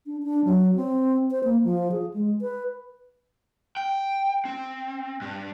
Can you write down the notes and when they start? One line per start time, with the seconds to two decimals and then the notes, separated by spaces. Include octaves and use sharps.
0.06 D4
0.23 D4
0.45 F#3
0.76 C4
1.31 C5
1.44 A#3
1.64 F3
1.92 G#4
2.14 G#3
2.42 B4
3.77 G5
4.45 C4
5.22 G2